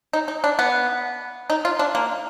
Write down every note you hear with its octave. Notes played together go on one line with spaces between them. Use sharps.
D#4
D#4
D4
B3
D#4
F4
D4
A#3